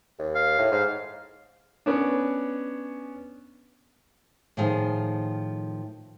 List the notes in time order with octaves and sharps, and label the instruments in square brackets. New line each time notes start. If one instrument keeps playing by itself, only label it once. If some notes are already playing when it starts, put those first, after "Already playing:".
[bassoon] D#2
[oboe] F5
[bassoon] A2
[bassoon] G#2 [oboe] F5
[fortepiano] B3 C#4 D4
[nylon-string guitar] A2 D#3 F3 F4 G#4